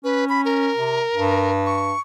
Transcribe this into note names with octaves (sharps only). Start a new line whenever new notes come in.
C#4 B4
B5
A#4
C3
G2
C#6